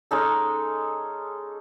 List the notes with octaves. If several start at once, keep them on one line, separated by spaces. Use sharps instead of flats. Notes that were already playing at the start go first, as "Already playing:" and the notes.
G#3 C#4 D#4 A4